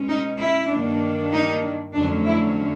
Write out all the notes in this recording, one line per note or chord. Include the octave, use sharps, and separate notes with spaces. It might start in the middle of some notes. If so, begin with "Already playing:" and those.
Already playing: B2 G#3 C#4
D#4
E4
G2 D#3 F#3 A#3 D4
D#4
F2 D3 F#3 A3 C#4 D4
E4